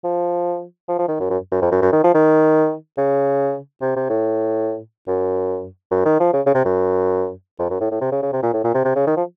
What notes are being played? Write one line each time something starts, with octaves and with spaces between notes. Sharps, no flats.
F3
F3
F3
D#3
F#2
F#2
F#2
F2
F#2
F#2
D#3
F3
D#3
C#3
C3
C3
A2
F#2
F#2
D#3
F3
C#3
C#3
C3
F#2
F2
F#2
A2
A2
C3
C#3
C#3
C3
A#2
A2
A#2
C3
C3
C#3
D#3
F3